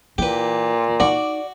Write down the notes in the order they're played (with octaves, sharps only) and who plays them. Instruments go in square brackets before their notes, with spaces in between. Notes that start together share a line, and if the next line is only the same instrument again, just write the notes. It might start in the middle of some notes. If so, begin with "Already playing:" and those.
[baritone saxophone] A#2 [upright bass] E3 [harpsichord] G4 B4
[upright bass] D#4 [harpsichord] F#4 [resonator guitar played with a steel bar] D5